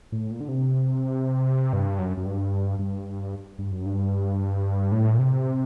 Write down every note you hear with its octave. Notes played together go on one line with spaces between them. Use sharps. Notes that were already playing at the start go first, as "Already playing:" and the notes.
A2
A#2
D3
C3
G2
F#2
F#2
G2
G2
G2
F#2
G2
A2
A#2
C3